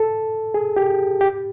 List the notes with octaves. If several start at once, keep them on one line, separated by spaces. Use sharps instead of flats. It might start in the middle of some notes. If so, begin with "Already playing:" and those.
Already playing: A4
G#4
G4
G4